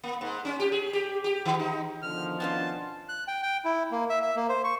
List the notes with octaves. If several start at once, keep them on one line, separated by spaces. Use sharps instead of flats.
A#3
G#2
C#4
G4
G#4
G4
G4
D#3
D#4
B2 D3 D#3 F3 F6
B3 C#4 D4 F4 A5
F#6
G5
G5
E4
A#3
E5
E5
A#3
C5
C#6